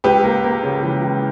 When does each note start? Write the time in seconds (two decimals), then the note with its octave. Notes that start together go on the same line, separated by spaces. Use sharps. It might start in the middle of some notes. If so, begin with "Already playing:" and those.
0.04 C#2 G4 B4
0.24 A#3
0.44 A#3
0.63 C#3
0.83 E3
1.03 E3